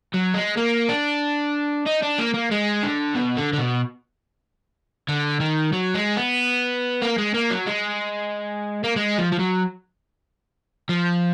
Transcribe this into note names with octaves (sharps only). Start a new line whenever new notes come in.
F#3
G#3
A#3
D4
D#4
D4
A#3
A#3
G#3
D3
B2
D3
D3
B2
D3
D#3
F#3
G#3
B3
A#3
G#3
A#3
F#3
G#3
A#3
G#3
F3
F3
F#3
F3